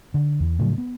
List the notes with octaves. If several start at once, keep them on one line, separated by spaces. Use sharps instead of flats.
D3
E2
A2 C#3 F3 F#3
B3